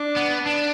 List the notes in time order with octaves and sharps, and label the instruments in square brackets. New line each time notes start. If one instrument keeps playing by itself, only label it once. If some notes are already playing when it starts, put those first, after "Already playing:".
Already playing: [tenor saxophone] D4
[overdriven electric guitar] B3
D4